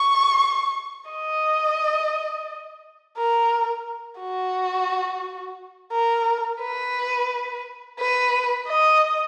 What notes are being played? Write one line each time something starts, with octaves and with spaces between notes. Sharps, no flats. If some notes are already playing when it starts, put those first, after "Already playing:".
Already playing: C#6
D#5
A#4
F#4
A#4
B4
B4
D#5